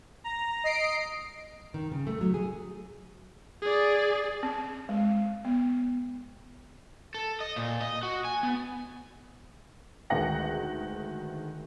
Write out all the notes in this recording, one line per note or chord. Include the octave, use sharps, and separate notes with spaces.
A#5
D#5 C7 D7
D#3
C#3
A3
F#3
G#4
G#4 D5
C4
G#3
B3
A4
D#5
A#2
D#5
F#4
G#5
B3
D2 D#3 G#3 B4 F#5 A#6